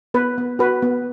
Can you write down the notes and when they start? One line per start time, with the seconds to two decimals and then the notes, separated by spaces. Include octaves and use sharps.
0.14 B3 B4
0.38 B3
0.59 F#4 B4
0.82 B3